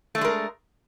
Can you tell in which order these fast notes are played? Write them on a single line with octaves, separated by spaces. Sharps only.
A3 D4 G#3 A#4